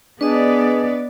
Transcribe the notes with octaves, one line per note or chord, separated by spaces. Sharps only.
B3 D4 G#4 B4 D5 D#5